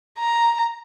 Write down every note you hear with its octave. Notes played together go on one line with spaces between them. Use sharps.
A#5